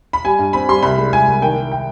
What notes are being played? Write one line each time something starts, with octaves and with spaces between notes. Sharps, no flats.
B5
G3 G#5
G2
C4 B5
G3 C6
C2 B5
G#3
C2 G#5
C2
D#3 G5
D#3
G5